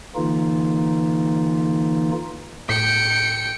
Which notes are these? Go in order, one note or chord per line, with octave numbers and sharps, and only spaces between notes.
D3 E3 A#3 D#4 F4
A2 G5 C#7